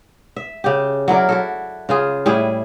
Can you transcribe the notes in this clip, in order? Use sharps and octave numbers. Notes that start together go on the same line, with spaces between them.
E5
C#3 G4
F#3 E4 A#4 D5
E4 F#4 A4
C#3 F4 G#4
A2 G3 E4 G#4